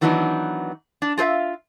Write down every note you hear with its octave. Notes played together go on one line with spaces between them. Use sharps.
D#3 E3 F#3 B3 D4 D#4
D4
F4 G#4 C5 E5 F5